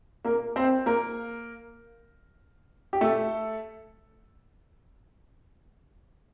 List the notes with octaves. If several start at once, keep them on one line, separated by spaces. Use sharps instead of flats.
A#3 A#4
C4 C5
A#3 A#4
G4
A3 A4